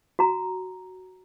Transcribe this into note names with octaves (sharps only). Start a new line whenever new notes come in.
F#4 A#5